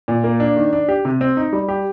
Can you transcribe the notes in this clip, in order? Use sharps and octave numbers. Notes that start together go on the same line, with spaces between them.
A#2
A#3
D4
D#3
D4
G4
C3
C4
D#4
G3
G4